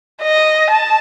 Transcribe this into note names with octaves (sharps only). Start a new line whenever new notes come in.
D#5
A5